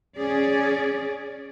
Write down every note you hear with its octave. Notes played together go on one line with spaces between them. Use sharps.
C#4 G#4 D5